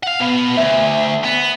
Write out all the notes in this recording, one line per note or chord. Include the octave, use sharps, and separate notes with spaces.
F5 F#5
B2 B3
D2 E5
B3